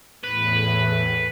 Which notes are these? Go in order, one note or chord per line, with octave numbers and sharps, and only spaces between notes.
E2 A2 B4